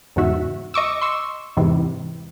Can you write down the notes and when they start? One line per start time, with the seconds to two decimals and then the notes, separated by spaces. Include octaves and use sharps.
0.16 E2 G#2 C#3 F#4 E5
0.74 D#5 C#6 D6 E6
1.02 C6 C#6 E6
1.57 E2 G#2 C3 E3